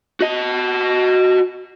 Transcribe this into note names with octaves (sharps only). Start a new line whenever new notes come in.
F#4 D#5